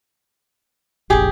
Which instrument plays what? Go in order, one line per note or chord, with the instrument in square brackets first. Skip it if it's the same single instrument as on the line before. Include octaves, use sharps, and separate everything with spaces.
[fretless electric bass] F1 A#1 [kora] G4 G#4